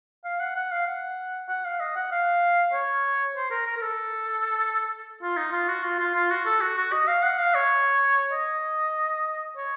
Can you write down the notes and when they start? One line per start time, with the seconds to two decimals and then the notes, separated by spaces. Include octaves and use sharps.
0.25 F5
0.40 F#5
0.56 F#5
0.72 F5
0.87 F#5
1.49 F#5
1.65 F5
1.80 D#5
1.96 F#5
2.12 F5
2.73 C#5
3.36 C5
3.51 A#4
3.67 A#4
3.77 A#4
3.82 A4
5.22 F4
5.37 D#4
5.52 F4
5.68 F#4
5.84 F4
5.99 F4
6.15 F4
6.31 F#4
6.46 A4
6.62 F#4
6.77 F#4
6.92 D#5
7.08 F5
7.23 F#5
7.39 F5
7.55 C#5
8.32 D#5
9.57 C#5